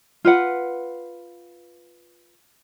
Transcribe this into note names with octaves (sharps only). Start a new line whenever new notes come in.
F4 B4 F#5